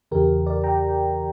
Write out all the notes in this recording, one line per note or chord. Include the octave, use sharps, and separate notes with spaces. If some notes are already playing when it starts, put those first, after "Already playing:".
E2 C#3 E3 G4 A#4
A#4 D5
G5 A#5